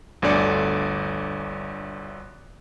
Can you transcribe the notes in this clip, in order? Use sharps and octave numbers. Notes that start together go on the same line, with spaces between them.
G1 D2 D3 D5 D6 C#7